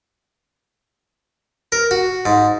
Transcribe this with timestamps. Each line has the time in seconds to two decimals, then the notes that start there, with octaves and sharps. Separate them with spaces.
1.72 A#4
1.91 F#4
2.26 G#2